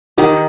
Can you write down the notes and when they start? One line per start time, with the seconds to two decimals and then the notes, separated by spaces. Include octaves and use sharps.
0.17 D#3 D#4 G4